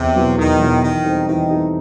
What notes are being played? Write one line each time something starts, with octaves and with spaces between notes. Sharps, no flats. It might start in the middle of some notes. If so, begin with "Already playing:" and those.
Already playing: E2 C3
B2 F#3 B3 E4
E2 D#3
B2 F#3 B3 E4
D#3 E3
G3 C4 D#4 A4
D#3 E3
G3 C4 D#4 A4